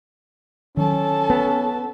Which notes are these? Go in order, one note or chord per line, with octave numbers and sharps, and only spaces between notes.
D#3 F#3 C#4 A4 A5
B3